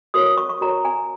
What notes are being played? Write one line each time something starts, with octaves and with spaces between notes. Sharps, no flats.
F#4 A#4 C#5 D#6
D#6
C#6
C#6
F#4 A#4 C#5 A#5
G#5